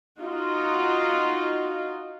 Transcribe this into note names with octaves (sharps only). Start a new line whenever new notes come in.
D#4 F4 F#4